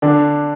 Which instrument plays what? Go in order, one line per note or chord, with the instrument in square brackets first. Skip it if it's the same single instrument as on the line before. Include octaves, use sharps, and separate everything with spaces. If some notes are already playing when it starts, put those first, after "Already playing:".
[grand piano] D3 D4